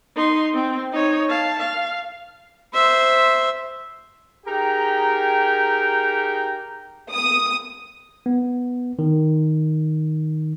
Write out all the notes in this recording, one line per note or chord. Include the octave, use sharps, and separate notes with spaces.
D#4 C6
C4
D#4 C#5
F5 A5
F5
C5 E5
D#4 G4 G#4 A#4 G5
D#6
B3
D#3